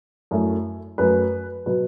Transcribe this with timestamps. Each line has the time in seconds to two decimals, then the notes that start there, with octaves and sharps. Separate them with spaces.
0.31 F#2 F#3 A3 E4
0.98 F#2 F#3 A3 B4
1.66 B2 F#3 B4